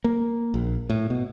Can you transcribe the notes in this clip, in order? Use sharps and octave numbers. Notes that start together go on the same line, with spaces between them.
A#3
A#1
A2
B2